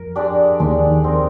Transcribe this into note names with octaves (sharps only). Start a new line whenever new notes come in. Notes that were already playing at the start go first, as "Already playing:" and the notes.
Already playing: F2 F3 A#4
G#3 D4 G4 D5
D#2 D#3 G#3 D4 G4 D5
C4 D#4 A#4